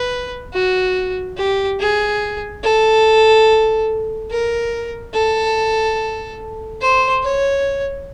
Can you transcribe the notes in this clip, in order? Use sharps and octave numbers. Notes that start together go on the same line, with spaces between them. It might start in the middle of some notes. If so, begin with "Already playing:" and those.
Already playing: B4
F#4
G4
G#4
A4
A#4
A4
C5
C#5